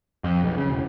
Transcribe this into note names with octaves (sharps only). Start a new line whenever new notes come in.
F2
B1
C#3
E1